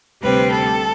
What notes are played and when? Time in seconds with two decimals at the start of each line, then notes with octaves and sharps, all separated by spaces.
0.22 D2 C3 G3 C4 B4
0.51 A4